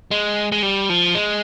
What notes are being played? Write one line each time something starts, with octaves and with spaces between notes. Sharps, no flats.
G#3
G#3
G3
F3
G#3